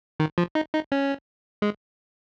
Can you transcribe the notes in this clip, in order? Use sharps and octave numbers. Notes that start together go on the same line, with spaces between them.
D#3
F3
D#4
D#4
C#4
G#3